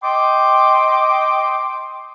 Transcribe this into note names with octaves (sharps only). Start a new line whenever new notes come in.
D#5 G5 C6 D6